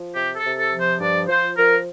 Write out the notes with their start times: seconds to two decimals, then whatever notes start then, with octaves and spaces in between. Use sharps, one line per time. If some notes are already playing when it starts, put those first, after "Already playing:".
Already playing: F3
0.14 C3 G4
0.36 A4
0.43 C3
0.57 A4
0.71 F3
0.78 C5
1.00 G2 D5
1.28 F3 C5
1.56 F3 A#4